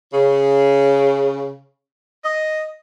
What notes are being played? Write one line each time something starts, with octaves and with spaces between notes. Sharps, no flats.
C#3
D#5